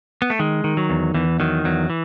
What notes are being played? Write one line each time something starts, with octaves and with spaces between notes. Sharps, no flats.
B3
A3
D#3 G#3
D#3
F#3
E2
E2 E3
D#3 F#3
E2 F#3
E3